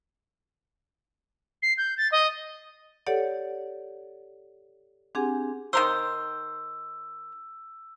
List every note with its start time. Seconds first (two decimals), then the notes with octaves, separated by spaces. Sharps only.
1.62 C7
1.77 G6
1.97 A6
2.12 D#5
3.07 G4 A4 C#5 D5 F#5
5.15 C4 D4 G4 G#4 F#5 G#5
5.73 D#3 A#4 C5 E6